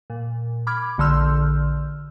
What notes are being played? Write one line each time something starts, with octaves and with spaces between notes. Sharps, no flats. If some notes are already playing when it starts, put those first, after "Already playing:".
A#2
B5 D6 F6 G#6
A#1 D3 C6 E6 F6 G6